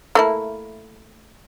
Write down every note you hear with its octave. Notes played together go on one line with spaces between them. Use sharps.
A3 A#3 E4